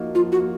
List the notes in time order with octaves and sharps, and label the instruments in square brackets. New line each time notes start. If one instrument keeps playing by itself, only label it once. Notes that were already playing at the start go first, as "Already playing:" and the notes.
Already playing: [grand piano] F3 A#3 D#4 F#4
[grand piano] F3 [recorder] F4
[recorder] F#4
[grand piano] A#3